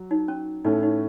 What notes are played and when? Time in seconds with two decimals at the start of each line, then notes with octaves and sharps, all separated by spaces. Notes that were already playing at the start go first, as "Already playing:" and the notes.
Already playing: F#3
0.11 D#4
0.28 C#4
0.65 A2 A3 C#4 D#4
0.83 D#4